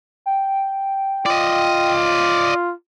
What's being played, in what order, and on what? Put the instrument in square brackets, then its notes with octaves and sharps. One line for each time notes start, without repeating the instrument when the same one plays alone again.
[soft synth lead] G5
[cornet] F4 [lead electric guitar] D5 D#5